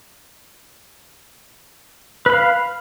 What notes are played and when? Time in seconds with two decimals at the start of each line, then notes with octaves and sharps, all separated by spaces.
2.26 B4
2.30 B5
2.33 F5